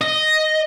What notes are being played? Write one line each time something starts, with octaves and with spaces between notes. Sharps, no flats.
D#5